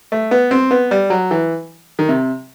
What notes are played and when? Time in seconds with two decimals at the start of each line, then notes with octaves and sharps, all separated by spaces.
0.12 A3
0.31 B3
0.51 C4
0.71 B3
0.91 G3
1.10 F#3
1.31 E3
1.99 D#3
2.09 C3